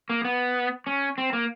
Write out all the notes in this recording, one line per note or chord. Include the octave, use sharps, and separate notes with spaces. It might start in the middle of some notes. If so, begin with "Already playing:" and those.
A#3
B3
C#4
C4
A#3